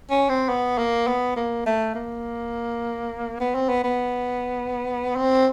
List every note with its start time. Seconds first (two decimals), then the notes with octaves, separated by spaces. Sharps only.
0.11 C#4
0.29 C4
0.49 B3
0.78 A#3
1.07 B3
1.36 A#3
1.66 A3
1.95 A#3
3.40 B3
3.55 C4
3.69 B3
3.84 B3
5.15 C4